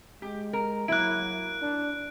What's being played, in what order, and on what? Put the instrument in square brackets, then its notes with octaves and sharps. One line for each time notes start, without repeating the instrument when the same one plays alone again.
[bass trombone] G#3 [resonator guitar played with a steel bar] G4
[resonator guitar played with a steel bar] A#4
[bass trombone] F#3 [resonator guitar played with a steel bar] A#3 E4 [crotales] F#6 D7
[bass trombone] D4